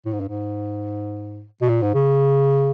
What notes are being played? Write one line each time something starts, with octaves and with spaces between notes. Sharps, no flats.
A2
G#2
G2
G#2
B2
A#2
G#2
C#3